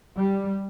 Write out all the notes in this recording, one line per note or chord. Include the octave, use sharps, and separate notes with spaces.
G3